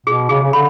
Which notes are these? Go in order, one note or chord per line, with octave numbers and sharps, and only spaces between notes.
B2 G#4
C#3 G#4
C#3
D3 B5